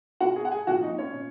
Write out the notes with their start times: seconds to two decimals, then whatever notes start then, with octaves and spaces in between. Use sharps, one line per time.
0.20 B2 F#4 F#5
0.36 G#4 G#5
0.45 F#5
0.52 G#4 G#5
0.67 A#2 F3 F#4 F#5
0.83 D#4 D#5
0.98 C#4 C#5
1.14 A#2